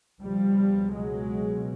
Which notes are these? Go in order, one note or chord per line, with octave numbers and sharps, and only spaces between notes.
C#2 B2 F3 G3
F#3 G#3